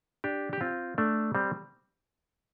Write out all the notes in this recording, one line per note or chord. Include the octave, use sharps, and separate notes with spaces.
D4 G4
G4
C4 F4
A3 D4
G3 C4